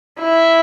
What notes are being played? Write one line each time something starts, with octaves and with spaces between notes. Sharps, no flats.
E4